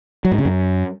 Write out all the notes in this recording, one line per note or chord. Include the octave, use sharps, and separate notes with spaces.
F#3
G#2
C#3
F#2